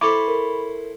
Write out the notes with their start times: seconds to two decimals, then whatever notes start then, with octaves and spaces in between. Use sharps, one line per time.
0.01 E4 A4 C5 B5 C#6 D6
0.28 A#4